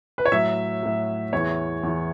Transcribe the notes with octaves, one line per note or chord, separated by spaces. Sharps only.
B4
C#5
A2 F#3 E5
A2 F#3
E2 E3 C#5
E2 E3